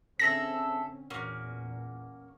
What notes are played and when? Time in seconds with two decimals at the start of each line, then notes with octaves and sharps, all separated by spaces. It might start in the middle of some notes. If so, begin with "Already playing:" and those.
0.20 D3 C4 C#4 G#4 A4 E5 A#6
1.10 E2 A#2 A#3 C#4 F#4